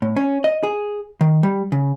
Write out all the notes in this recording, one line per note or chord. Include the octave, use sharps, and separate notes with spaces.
A2
C#4
D#5
G#4
D#3
G3
C#3